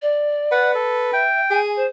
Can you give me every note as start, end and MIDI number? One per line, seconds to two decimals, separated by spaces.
0.02 0.73 74
0.52 1.24 71
0.52 0.71 78
0.75 1.11 69
1.13 1.41 76
1.13 1.60 79
1.51 1.86 68
1.51 1.71 80
1.76 1.86 72